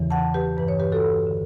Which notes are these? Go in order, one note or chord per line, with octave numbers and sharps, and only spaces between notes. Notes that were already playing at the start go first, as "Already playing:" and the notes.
Already playing: E2 C#3 E3
F#5 A5
G4 B4
G2 E3 B4
C#5
G4 B4
F#4 A4
D3